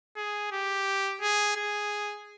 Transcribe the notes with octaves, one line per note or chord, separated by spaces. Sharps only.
G#4
G4
G#4
G#4